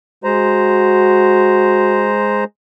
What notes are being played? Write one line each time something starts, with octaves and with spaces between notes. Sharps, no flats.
G#3 F#4 C5 A#5